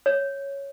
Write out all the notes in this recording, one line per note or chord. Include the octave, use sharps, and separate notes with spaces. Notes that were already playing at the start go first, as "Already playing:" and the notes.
C#5